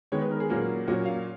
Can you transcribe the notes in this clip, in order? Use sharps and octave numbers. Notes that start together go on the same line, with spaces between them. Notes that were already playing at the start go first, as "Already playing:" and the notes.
D#3 G#3 B3 C#5
B4
A#4
G#4
A#2 F#3 A#3 C#4
A#2 F#3 A#3 C#4 F#4
F5